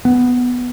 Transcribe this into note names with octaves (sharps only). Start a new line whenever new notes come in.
B3